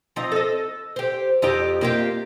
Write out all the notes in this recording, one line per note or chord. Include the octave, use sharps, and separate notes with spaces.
F3 C4 D#4
A4 D#5
G4 C5
F2 D#4 G4
A#3 F4 G4